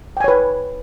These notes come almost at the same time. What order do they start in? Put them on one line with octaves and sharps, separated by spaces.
G5 G#5 C#5 B4